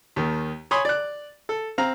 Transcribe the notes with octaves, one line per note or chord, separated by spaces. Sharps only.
D#2 D#3
C#5 G#5 B5 C6 D#6
D5 F#6
A4
C4 F5 A#5